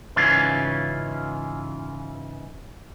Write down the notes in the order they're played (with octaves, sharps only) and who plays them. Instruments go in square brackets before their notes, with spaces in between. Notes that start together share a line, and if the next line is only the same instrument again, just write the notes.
[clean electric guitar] G#2 C#3 E3 C#4 F4